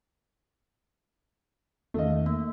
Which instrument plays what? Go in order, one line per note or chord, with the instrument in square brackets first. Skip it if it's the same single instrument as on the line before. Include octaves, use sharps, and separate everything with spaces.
[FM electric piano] E2 D#3 F5 [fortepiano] A3 D#5
[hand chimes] A#3